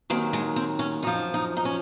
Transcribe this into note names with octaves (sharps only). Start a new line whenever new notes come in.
D#2 D#3 F#3 C4
G#3
C4
C#4
F#2 F3 D#4
D#4
D#4
C#4